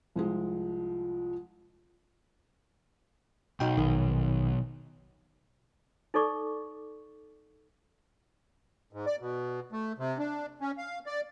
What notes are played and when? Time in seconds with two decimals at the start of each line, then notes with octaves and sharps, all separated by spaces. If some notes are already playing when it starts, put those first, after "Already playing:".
0.16 C2 F3 G#3
3.60 B1 D#4 F#4 G5
3.77 A#1 D#3
6.14 D#4 A4 D5 C#6 D6
8.93 G#2
9.06 D5
9.21 B2
9.72 A3
9.98 C3
10.18 D4
10.61 C#4
10.78 F5
11.06 D5